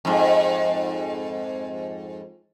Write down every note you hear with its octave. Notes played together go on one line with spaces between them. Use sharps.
F2 G#2